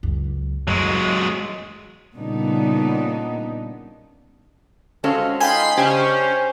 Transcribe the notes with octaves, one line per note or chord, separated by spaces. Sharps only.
C#2 F#2
F#2 F#3 G#3
A#2 C#3 G3 B3 D4 D#4
G#3 C4 C#4 F4 F#4 A4
D#4 F4 D#5 G5 G#5 B5 C6 C7
C#3 C#4 D4 G4 C5